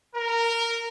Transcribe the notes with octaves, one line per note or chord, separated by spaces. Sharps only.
A#4